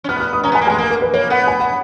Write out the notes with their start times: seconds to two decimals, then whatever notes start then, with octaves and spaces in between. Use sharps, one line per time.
0.04 C#4
0.09 B3 F6
0.16 F#6
0.20 F6
0.33 D#6
0.43 C#4 A#5
0.52 B3
0.55 G#5
0.61 A#3
0.67 G#3 G#5
0.78 A#3 A#4
0.91 A#4
1.02 B4
1.14 A#3 C#5
1.30 B3 F#5
1.47 G#5
1.60 F#5